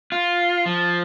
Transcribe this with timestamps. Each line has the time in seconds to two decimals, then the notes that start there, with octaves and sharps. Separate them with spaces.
0.12 F4
0.66 F3